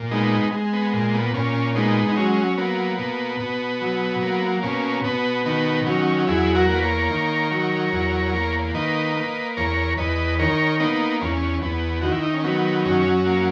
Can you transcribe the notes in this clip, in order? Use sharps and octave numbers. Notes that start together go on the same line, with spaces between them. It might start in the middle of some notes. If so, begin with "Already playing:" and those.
Already playing: A#2
G#3 B3 D#4
G#3
B3
A#2
B3
A#2 C#4
G#3 B3 D#4
D#4
F#3 C#4
A#3 B3
B2
B2
F#3
A#3
B2 C#4
B2 B3
D#3 B3
F#3 C#4
E2 E4 G#4
F#4 A#4
A#3
B4
A#4 C#5
D#3
F#3
E2
A#3
D#3 B4 D#5
A#3
E2 A#4 C#5
E2 B4 D#5
D#3 A#4 C#5
A#3 B3 D#4
E2 C#4
E2 B3
D#3 F#4
E4
D#4
C#4
F#3 B3
F#2 C#4
A#3